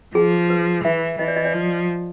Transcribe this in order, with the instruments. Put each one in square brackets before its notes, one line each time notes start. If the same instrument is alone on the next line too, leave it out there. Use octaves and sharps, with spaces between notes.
[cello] F3 [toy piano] G#4
[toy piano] B4
[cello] E3 [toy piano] E5
[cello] E3 [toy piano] D#5
[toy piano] D5
D#5
D5
[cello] F3